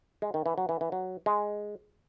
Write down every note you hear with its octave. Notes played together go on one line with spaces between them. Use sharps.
G#3
D#3
E3
F#3
E3
E3
F#3
G#3